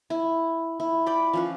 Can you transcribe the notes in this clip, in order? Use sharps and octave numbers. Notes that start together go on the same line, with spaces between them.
E4
E4
D5 G5 B5
F3 C#4 B4